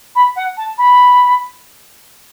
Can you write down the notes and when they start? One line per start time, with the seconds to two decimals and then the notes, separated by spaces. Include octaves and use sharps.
0.15 B5
0.36 F#5
0.57 A5
0.78 B5